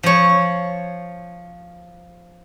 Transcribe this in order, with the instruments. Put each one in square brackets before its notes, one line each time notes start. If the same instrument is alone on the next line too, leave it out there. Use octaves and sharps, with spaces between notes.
[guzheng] F3 C#5